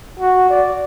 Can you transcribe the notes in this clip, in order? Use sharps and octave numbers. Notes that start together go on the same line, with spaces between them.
F#4
D5